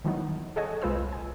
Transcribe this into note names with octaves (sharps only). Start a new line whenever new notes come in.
D#3 E3 F#3 B3 D#4
G#4 A4 C#5 D#5 F#5 G#5
C2 G#3 F4 B4 C5 E6
G#5